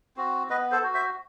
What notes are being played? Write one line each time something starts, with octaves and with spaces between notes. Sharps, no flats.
C4 F#4
B3 B4 D#5
A4 C5
F#4
C5 E5